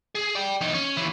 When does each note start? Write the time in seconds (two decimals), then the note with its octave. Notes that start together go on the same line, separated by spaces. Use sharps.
0.15 G#4
0.35 D5 G5
0.61 E2 D#4
0.74 C#4
0.97 D#2 E3